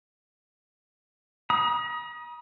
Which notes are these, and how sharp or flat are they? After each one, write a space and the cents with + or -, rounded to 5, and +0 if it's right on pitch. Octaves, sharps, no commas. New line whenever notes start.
A#5 +45 D#6 +5